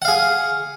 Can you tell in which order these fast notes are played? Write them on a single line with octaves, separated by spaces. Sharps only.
F#5 F5 G#4